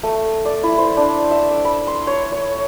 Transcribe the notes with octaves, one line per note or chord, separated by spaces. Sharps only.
A3
D5
E4
C5
D4
E5
D6
B5
C6
C#5
C#5